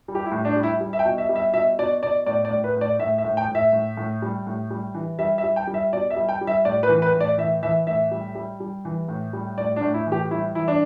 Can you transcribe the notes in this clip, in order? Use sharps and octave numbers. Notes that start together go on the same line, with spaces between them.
G3
G4
E4
A2
D4
G3
E4
G3
E5
G5
B2
E5
G3
E5
B2 E5
B2 D5
B2 D5
A2 D5
D5
A2
B4
A2 D5
A2 E5
E5
A2
G5
A2
E5
A2
A2
G3
A2
G3
E3
G3 E5
E5
G3
G5
G3
E5
B2 D5
E5
G3
G5
G3
E5
A2 D5
B4
E3
B4
A2
D5
E3 E5
E3 E5
A2 E5
G3
G3
G3
E3
A2
G3
A2 D5
D4
A2
E4
E3
G4
G3 E4
E3 E4
D4